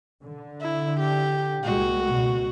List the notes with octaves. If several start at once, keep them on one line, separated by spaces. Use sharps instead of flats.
D3
E4
G4
C2 A#2 G#3 F#4
C#2 B2